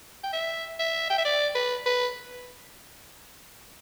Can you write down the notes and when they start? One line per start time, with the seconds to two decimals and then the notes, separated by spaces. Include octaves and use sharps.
0.24 G5
0.33 E5
0.79 E5
1.10 G5
1.18 E5
1.25 D5
1.55 B4
1.86 B4